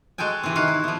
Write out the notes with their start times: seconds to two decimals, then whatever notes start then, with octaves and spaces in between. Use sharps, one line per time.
0.18 G#3 F#4 A4 G5 G#5
0.44 C3 E3 C4
0.55 D#3 F#4 F5
0.68 E4
0.84 F3 B3